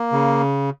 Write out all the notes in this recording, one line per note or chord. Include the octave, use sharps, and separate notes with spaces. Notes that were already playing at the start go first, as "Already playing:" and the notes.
Already playing: A#3
C#3